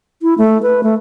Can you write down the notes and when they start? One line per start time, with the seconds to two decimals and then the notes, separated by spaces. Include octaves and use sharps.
0.22 E4
0.38 A3
0.63 B4
0.83 A3